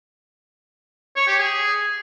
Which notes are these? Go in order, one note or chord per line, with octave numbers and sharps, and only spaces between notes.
C#5
G4
G#4